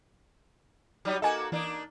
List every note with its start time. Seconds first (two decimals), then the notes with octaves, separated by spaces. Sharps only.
1.05 F#3 G3 D#4
1.22 A#3 F#4 A4 D#5 G#5
1.52 E3 A#3 D4 D#4